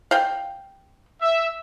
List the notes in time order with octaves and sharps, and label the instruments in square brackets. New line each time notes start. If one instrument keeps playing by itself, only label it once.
[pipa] F5 G5
[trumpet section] E5